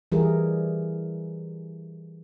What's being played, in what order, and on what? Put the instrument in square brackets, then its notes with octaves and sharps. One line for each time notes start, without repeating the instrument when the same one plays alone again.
[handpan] E3 G3 E4 G#4 A#4